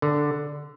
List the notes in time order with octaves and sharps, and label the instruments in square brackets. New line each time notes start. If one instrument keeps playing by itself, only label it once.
[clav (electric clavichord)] D3